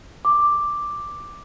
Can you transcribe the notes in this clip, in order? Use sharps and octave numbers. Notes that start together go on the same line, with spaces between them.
D6